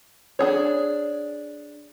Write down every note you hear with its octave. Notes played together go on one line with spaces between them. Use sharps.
D4 G#4 C#5